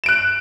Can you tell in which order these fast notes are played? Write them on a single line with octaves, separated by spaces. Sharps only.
E7 D7 F#6